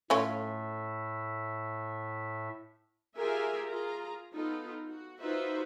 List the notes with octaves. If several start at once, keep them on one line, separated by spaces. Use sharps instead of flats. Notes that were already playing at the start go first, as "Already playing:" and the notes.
A2 A3 C#4 F4 E5
F4 G4 G#4 A#4 E5 G#5
F4 G#4 A#5
B3 D#4 F4 A4
F#4
D#4 F4 F#4 B4 C5 E5